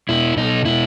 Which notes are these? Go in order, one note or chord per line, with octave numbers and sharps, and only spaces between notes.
B2 E4
B2 D#4
B2 E4